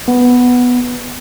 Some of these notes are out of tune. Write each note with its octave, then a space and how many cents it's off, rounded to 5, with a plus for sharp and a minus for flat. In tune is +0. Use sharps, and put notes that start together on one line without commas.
B3 +0